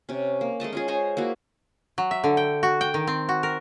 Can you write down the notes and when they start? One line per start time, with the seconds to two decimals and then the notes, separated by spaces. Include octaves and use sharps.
0.09 C3 C#4
0.41 A#3
0.60 G#3 A3 D#5 A5
0.73 C#4 F4 G#4
0.88 C5 C#5 G#5 A#5
1.17 A#3 E4 F#4
1.98 F#3
2.11 E5
2.24 D3
2.37 G5
2.63 F#4
2.81 G5
2.94 D#3
3.07 C4
3.29 F#4
3.43 A#4